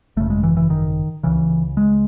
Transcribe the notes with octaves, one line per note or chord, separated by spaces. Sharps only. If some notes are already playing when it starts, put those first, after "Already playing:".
G#1 F#2 C#3 A3
G#3
E3
E3
D#3
C#2 C#3 E3
G#3